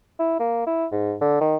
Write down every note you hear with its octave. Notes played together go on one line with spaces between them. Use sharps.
E4
A#3
E4
G#2
D3
D#3